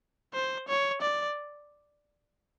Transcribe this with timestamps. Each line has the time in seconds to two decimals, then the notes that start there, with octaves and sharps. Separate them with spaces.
0.34 C5
0.68 C#5
1.01 D5